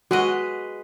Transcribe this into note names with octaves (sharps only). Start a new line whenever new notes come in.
G#3 F#4 B4 D#5